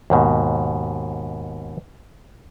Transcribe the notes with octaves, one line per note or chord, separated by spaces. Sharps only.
D#2 G#2 B2